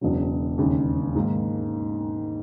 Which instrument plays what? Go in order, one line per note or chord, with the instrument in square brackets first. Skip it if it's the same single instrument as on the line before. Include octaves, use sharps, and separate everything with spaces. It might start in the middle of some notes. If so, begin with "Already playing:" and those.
[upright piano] E1 E2 C#3 F#3
E1 D#2 C#3
G#2 D#3 A#3